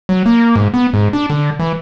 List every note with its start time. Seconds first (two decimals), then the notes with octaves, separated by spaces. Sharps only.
0.09 F#3
0.26 A#3
0.56 G#2
0.74 B3
0.94 G#2
1.13 D4
1.30 D3
1.59 E3